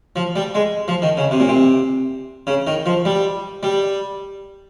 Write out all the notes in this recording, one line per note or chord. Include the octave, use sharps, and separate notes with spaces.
F3
G3
G#3
F3
D#3
C#3
C3
A#2
C3
C#3
D#3
F3
G3
G3